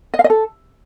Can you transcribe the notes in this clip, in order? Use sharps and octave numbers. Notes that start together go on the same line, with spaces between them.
D#5
F5
D#5
A4